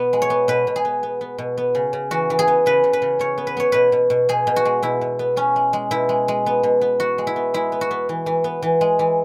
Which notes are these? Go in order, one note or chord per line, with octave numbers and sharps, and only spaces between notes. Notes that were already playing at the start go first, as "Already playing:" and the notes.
Already playing: B2 B3
G#3
C#5
B3
B2 B4
B2
G#4
B3
B3
B3
B2
B3
C#3
C#3
E3 F#4
E3
G#4
B3
C#3 B4
C#3
B4
C#3
C#3 C#5
B3
B4
B3 C#5
B2 B4
B2
B2
B2 G#4
B2
F#4
G#3
B2 E4
B2
B3
B3 C#4
G#3
G#3
B2 E4
G#3
G#3
B3
B2
B3
B3 F#4
G#3
E4
B3
G#3 E4
B3
F#4
B3
E3
E3
B3
E3
G#3
E3